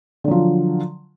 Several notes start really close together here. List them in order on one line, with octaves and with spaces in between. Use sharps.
D3 F#3 F3